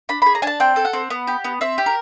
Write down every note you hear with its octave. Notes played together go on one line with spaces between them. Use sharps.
D4 B5
G#4 B5
A#5
D4 G#5 A5
C4 G5
A4
F#5
C4
B3
G4
B3
C4 E5
G4
A#4